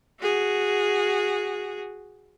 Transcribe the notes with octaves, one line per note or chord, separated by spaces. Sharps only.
F#4 G#4